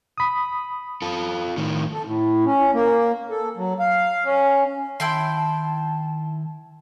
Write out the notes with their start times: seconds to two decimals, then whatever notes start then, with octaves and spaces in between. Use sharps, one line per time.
0.18 B5 D#6
1.02 F4 A4
1.57 A2 D#3
1.91 A4
2.05 A2
2.46 C#4
2.74 A#3
3.30 A4
3.57 F#3
3.80 F5
4.25 C#4
5.00 D#3 E4 G5 A5 C6